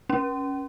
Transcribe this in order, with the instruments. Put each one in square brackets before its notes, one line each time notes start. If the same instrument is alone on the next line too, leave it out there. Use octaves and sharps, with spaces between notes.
[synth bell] C#4